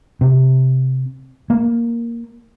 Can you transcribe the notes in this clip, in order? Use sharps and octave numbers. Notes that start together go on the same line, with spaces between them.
C3
A#3